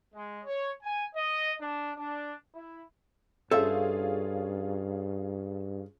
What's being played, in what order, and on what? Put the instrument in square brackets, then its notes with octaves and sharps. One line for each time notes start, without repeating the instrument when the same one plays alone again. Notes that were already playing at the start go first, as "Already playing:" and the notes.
[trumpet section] G#3
C#5
G#5
D#5
D4
D4
E4
[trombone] G2 [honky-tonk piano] C#4 F4 G#4 [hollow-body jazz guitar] A4 C5 E5